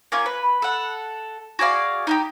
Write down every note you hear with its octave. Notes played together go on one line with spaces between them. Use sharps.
A#3 C#4 F4 C#6
B4
A4 F#5
F#4 G#4 D5 F5
D#4 F4 G4